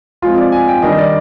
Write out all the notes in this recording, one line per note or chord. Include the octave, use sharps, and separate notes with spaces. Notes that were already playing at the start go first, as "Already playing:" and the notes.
F3 G#3 C4 F4
D5
G#5
G5
D#3 G3 D4 D#5
D5